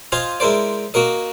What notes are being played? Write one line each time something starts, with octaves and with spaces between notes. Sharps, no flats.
F4 C5 D#5 F5 G#5
G#3 E4 A#4 C5 D5
A#3 F#4 A#4 D#5